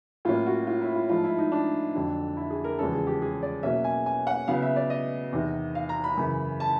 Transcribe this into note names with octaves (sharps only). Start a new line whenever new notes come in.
A2 F#3 A#3 C#4 F4
F#4
F4
E4
F4
G#2 F3 A3 F4
E4
D#4
D4
F2 D3 F#3
E4
G#4
A#4
E2 C#3 F3 G#3 C#4 A4
G#4
G4
G#4
D5
B2 F#3 A#3 C#4 E5
G#5
G#5
F#5
C#3 F#3 B3 F5
E5
D5
D#5
E2 C3 D#3
F5
A#5
B5
F#2 C#3 E3
A5